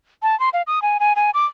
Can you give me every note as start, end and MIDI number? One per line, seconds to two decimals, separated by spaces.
0.23 0.38 81
0.40 0.49 84
0.53 0.62 77
0.67 0.82 87
0.82 0.98 80
1.00 1.13 80
1.16 1.31 80
1.34 1.45 86